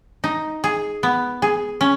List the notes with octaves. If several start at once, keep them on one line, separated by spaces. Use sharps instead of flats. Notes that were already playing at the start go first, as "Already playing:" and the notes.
D#4
G#4
B3
G#4
C#4